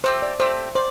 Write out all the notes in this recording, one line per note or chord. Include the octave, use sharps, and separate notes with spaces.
A3 C4 G4 C5
D5
A3 C4 G4 C5
C5 D5